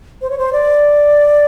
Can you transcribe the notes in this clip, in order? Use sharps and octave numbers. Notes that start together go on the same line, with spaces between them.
C5
C#5
C5
D5